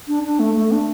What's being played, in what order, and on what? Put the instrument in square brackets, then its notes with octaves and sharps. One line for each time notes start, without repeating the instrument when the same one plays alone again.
[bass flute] D4
D4
A3
A3
D4